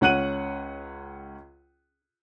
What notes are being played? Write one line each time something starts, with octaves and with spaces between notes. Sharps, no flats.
C#2 C#4 F#5 F#6 D#7 F#7